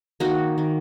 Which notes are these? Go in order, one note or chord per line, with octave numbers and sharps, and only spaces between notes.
D#3 A#3 D#4 F#4
D#3 A#3